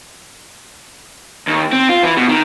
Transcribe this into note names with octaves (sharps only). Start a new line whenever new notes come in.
D#2
C4
F4
E3
B2
D#3